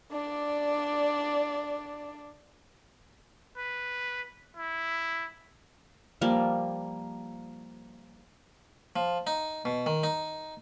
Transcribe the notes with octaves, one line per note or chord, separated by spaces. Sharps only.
D4 D5
B4
E4
F3 G3 A#3
F3
D#4
B2
D#3
D#4